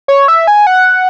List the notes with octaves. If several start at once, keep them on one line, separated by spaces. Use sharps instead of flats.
C#5
E5
G#5
F#5